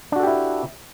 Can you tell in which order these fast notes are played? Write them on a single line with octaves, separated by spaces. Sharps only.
D4 F#4 A4 G4 E4